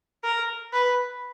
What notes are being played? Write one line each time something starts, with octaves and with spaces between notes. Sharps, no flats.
A#4
B4